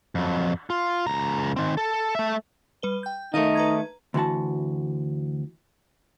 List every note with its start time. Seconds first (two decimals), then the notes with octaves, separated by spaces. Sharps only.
0.15 F2 F#3
0.70 F4
1.07 C#2 A#5
1.56 D#3 C4
1.77 A4
2.15 A3 E5
2.82 G3 B4 G7
3.03 G5 G6
3.34 D#3 A3 D#4 A#4 D#5 F5
3.55 B4 A#5 G#6
4.14 D2 E3 F#4 A5